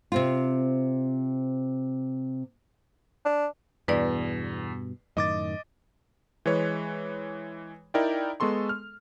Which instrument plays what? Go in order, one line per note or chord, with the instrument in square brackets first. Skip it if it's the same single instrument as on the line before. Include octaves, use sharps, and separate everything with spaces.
[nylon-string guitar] C3 C4 F4
[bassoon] D4
[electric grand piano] E2 [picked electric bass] G2 B2 [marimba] B4 D5
[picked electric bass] F#2 A2 D#3 [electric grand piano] D#5 D6 A6
[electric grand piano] E3 G#3 B4 C#5
D#4 E4 A#4 D5 G5
G#3 B3 A4 C6 C#6
F6